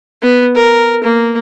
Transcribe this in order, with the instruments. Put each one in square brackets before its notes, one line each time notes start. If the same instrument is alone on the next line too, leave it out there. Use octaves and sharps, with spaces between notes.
[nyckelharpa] B3
A#4
A#3